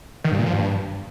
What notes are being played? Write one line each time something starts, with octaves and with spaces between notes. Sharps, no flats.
D#3
G2
A#2
F3
G2